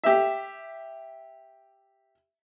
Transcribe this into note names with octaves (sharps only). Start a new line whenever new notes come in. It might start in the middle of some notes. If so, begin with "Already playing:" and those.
G4 E5